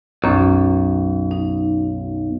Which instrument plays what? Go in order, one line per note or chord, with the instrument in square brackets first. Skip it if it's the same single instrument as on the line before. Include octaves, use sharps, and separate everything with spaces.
[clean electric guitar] B1 [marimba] F#2 C#4
[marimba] D#4